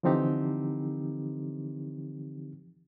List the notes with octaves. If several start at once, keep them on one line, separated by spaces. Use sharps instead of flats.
D3 E3 F3 C4 D#4 G4